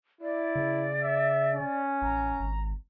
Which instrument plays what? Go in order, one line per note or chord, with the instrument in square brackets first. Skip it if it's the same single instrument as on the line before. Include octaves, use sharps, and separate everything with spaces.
[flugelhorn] E4 [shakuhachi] D5
[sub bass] C#3
[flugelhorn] E5
C#4
[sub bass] A1 [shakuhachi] A#5
[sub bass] G#1